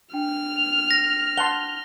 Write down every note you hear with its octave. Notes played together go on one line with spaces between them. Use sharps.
D4 G5 F6
A#6
F#5 A5 C6 G7